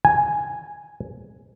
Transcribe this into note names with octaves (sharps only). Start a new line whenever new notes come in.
G#5